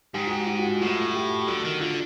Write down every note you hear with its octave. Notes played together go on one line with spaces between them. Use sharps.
G#2 G4
F#4
G4
F#4
F#4
F4
A2 F4
G4
D3 F#4
D#3
D3 F4